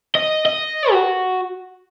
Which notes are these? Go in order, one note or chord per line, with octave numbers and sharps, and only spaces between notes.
D#5
D#5
F#4